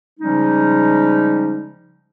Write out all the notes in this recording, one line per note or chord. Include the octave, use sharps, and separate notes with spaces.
C#3 F3 G3 G#3 C#4 D#4